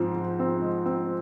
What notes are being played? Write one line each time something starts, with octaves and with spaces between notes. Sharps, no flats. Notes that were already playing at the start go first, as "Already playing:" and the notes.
Already playing: G#2 F3 C4
F3
C4
G#3
C4